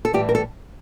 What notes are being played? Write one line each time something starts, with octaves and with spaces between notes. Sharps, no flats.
A4
A2 E3 G3 G4
A#4
A4